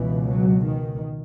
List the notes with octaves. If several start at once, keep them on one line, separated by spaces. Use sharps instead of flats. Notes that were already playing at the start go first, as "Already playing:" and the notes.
Already playing: C#2 B2 E3
F#3
D#3